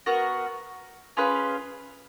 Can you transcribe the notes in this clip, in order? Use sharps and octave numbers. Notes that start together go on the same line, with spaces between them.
B3 F#4 A#4
C#4 F4 G#4 B4